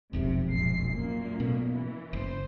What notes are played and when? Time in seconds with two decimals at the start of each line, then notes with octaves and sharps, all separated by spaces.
0.13 E1 B1 F2 C3
0.50 A#1 G#2 C7
0.91 F#2 A#2 A#3
1.40 B2
1.73 E3
2.13 F#1 C5